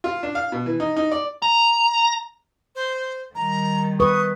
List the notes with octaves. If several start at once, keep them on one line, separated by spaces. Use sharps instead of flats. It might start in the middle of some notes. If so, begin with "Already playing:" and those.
F4
D4
F5
B2
E3
D#4
D#4
D5
A#5
C5
D#3 G3 A#5
B4 C#6 D#6